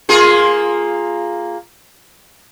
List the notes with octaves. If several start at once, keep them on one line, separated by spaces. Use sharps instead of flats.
A#3 F4 G#4